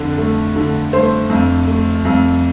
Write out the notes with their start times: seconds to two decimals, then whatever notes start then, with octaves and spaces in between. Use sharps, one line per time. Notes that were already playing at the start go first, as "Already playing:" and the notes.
Already playing: F2 D3
0.18 A3
0.56 D3
0.93 A3 C5
1.30 F2
1.67 A3
2.05 F2